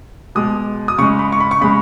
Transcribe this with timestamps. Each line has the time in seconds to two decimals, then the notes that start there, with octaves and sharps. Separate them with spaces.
0.35 B2 G#3 D#6
0.88 D#6
0.98 C#3 C#6
1.02 G#3
1.19 B5
1.32 C#6
1.40 B5
1.51 C#6
1.61 C#3 G#3 B5